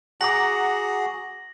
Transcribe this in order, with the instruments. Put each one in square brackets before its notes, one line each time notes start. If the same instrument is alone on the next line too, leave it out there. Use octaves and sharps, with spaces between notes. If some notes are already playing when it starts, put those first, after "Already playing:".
[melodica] F#4 G#4 [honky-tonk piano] F#5 A#5 D6 [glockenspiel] A#6 F#7